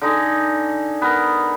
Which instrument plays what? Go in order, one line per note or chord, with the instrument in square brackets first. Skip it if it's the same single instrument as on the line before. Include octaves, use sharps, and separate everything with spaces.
[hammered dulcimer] D3 D#4 G#4
B3 A#4